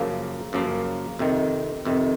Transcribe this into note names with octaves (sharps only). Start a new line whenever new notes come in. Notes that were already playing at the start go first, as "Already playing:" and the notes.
Already playing: F#2 C#3 F3 A#3
F#2 C#3 F3 A#3
F2 C3 D#3
F2 C3 D#3